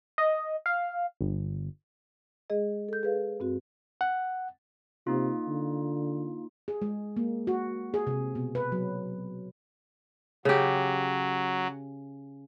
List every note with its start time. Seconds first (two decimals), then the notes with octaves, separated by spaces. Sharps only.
0.18 D#5
0.66 F5
1.21 G1
2.50 G#3 G#4 D#5
2.89 A4 G6
3.03 G#4 B4 F5
3.40 G2 C4 F#4
4.01 F#5
5.07 C3 A#3 D#4 F4
5.48 D3
6.68 G#4
6.82 G#3
7.17 A#3
7.47 F#4
7.94 G#4
8.07 C3
8.35 B2
8.55 B4
8.72 F#3
10.45 C#3 F#3 G4